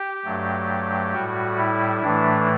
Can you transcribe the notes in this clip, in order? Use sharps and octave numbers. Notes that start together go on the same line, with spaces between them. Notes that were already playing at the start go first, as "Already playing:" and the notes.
Already playing: G4
G2 F#3 A3
A2 G3 F#4
E4
A2 E3 A3 D4